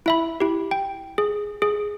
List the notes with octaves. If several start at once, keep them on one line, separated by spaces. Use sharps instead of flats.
E4 E5 B5
E4 G4
G5
G#4
G#4